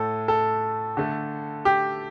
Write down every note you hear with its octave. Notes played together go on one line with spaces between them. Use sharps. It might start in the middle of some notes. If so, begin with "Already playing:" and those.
Already playing: A2 A3 A4
A4
D3 A3
G4